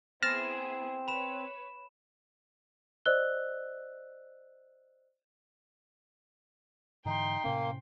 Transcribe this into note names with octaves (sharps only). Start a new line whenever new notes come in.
B3 C4 E4 G#4 F6 A6 A#6 E7
B4 C#5 B5 E7
C5 D5 D#5 E6 F#6 G7
G#2 D3 E3 D#4 G5 C6
A2 C3 A#3 C#4